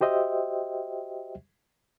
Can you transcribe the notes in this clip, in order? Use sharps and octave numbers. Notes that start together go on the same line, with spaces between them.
F#4 G4 C5 D#5 E5 G5